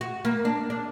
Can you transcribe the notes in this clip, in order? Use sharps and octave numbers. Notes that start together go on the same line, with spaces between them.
F#4
A#3
D4
D4